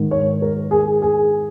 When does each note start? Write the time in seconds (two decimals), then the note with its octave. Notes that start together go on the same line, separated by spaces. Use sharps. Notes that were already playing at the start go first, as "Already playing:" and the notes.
Already playing: G#2 D#3
0.11 C#5
0.42 A#4
0.71 G#4
1.02 G#4